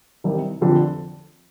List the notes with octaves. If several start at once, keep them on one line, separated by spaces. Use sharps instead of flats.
C2 C3 D#3 G3 C4
F1 F2 D3 F3 C4